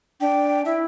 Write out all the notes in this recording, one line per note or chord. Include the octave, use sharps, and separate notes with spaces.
D4 G5
E4 E5